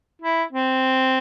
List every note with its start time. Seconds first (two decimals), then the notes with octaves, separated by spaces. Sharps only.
0.22 E4
0.52 C4